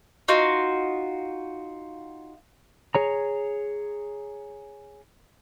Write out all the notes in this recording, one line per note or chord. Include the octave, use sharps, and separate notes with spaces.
D#4 F4 F#4
G#4 C#5 A#5